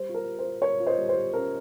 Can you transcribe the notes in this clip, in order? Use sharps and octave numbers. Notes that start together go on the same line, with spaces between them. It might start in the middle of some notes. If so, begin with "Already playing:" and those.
Already playing: G3 C5
F4
A#4
G3
C5
F4
G3 A#4 C#5
F4
C5 D#5
G3
C5
G3
C#4 A#4